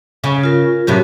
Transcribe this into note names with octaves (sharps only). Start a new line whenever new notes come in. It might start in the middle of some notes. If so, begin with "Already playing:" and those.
C#3
F4 A#4
F#2 A2 C3 F#4 G4